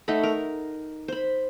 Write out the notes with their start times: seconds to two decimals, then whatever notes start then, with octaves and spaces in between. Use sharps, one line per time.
0.08 A3 D#4 F#5 B5
0.23 A#4
1.08 C5 B5